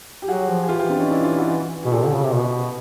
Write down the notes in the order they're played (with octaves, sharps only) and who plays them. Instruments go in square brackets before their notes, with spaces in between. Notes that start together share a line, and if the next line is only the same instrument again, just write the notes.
[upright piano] G4
[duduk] F#3 [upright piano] F#4 G#4
[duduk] F3
[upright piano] G#4
[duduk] E3 [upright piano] F4 G4
[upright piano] F4 G4
C4 D4
C#4 D#4
D4 E4
D#4 F4
E4 F#4
[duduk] B2 [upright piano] G#4
[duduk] A#2 [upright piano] G4 A4
[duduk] D3
C#3
C3
B2